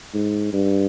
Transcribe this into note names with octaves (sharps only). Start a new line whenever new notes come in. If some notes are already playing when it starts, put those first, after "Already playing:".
G#2
G2